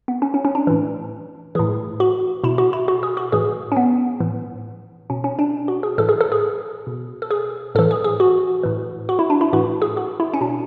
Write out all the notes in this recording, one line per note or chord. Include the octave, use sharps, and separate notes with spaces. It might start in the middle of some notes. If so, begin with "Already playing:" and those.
B3
C#4
C#4
C#4
D4
A2 E3
A2 E3 G#4
F#4
B2 E4
F#4
E4
F#4
G#4
F#4
A2 E3 G#4
C#4
B3
A2 E3
B2 C#4
C#4
D4
F#4
G#4
A2 E3 A4
G#4
A4
G#4
B2
A4
G#4
A2 E3 A4
G#4
G#4
F#4
A2 E3
F#4
E4
D4
E4
A2 E3 F#4
G#4
F#4
E4
C#4
B2 D4